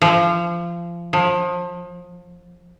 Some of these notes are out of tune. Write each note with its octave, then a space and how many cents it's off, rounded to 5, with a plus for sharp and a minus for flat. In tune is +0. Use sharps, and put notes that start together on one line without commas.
F3 -25
F3 +30